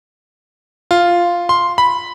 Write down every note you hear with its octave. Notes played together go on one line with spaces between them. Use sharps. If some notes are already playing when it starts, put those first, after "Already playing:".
F4
C6
B5